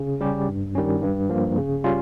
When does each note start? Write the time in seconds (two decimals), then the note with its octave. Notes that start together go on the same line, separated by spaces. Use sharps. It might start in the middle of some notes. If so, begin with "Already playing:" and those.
Already playing: C#3
0.21 G3 C#4 G4
0.48 G2
0.75 D#3 G3 C#4
1.03 G2
1.29 F3 A#3
1.57 C#3
1.84 G3 C#4 F4